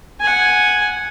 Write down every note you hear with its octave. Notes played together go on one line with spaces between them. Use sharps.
F#5 G#5